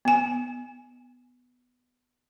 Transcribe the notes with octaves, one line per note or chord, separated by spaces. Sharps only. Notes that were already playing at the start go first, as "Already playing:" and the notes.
B3 G#5